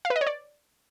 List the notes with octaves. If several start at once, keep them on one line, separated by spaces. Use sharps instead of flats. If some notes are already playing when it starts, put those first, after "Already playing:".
F5
B4
D#5
C#5
D5